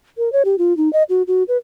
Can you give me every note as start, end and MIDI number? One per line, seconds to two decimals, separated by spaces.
0.18 0.31 70
0.33 0.43 73
0.45 0.56 67
0.58 0.76 65
0.77 0.91 63
0.93 1.03 75
1.09 1.22 66
1.27 1.43 66
1.48 1.57 71